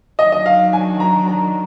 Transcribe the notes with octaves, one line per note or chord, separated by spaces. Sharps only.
D#3 F#3 D4 D#5
D#5
F5
G#5
A#5
A#5